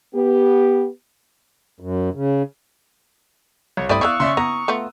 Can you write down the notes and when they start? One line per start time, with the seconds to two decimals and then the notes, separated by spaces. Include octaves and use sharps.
0.14 B3 G4
1.80 F#2
2.14 C#3
3.77 C2 C#5
3.89 G2 A3 C4 E4 D5 B5 D#6
4.01 B3 D#4 E4 F5 C#6 E6 F#6
4.20 C#3 D5 E5 C6
4.37 B3 E4 A#5 D#6
4.68 A3 B3 F4